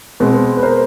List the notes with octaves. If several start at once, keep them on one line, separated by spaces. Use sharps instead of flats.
B2 G#3 C4
B4
A#4 C5